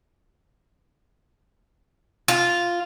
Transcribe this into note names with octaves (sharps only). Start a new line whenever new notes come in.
F4